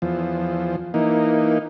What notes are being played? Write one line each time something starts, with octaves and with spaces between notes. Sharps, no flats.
E2 F3
E3 A#3 D#4